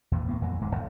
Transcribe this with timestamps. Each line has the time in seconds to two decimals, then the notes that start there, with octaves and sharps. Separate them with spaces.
0.11 E2 A#2 E3
0.28 E2 A2 A#3 B3
0.41 F2 A#2 E3 F#3
0.61 D1 G#2 G#3
0.75 B1